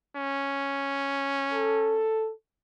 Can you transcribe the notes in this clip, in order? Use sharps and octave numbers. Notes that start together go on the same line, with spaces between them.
C#4
A4